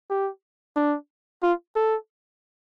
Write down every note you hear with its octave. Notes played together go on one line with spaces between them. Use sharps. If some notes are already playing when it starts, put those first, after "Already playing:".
G4
D4
F4
A4